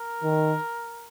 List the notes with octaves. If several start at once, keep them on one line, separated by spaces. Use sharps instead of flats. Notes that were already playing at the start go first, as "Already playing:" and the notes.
Already playing: A#4
D#3